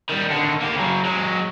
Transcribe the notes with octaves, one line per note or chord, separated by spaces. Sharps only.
D#3 G3
D3 D#3
A#3 G4
C#3 F#3
F#3 G#3